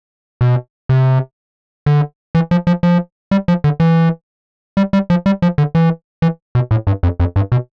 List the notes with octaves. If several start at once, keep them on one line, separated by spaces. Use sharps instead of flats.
B2
C3
D3
E3
F3
F3
F3
G3
F3
D3
E3
G3
G3
F3
G3
F3
D3
E3
E3
B2
A2
G2
F2
F2
G2
B2